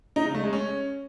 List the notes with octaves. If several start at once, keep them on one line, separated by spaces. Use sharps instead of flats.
D#4
C#3
A3
G#3
C#4